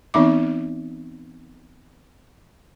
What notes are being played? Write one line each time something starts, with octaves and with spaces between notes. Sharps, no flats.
E3 B3 C4 D#4 E5 D6